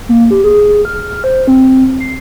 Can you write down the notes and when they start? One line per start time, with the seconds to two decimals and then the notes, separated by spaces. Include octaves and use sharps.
0.09 A#3
0.31 G4
0.44 G#4
0.85 F6
1.24 C5
1.47 C4
2.00 C7